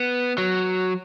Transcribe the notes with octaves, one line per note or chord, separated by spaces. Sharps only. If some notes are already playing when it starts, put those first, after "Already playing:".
Already playing: B3
F#3